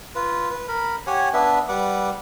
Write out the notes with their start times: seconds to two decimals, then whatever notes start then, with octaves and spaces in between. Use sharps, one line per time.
0.15 F4 B4
0.50 B4
0.68 A#4 B5
1.07 G4 C#5 F#5 G#5
1.34 B3 D4 B4 E5
1.69 G3 B4 F#5 D6